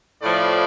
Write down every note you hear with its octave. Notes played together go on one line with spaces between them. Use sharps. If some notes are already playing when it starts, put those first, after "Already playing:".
A2 F3 D5